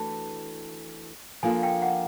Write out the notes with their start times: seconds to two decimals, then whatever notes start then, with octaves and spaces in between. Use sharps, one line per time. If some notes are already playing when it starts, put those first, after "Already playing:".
Already playing: E3 A3 D4 F#4 A4 A5
1.43 F3 A#3 D4 F4 A4 G#5
1.63 G5
1.82 F#5